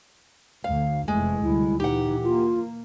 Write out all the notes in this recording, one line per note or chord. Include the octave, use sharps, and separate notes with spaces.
D2 F5
F1 E3 G#3 A3
D2 C3 G3 E4
A#2 E3 D#4 G4 F#5
A#3 F4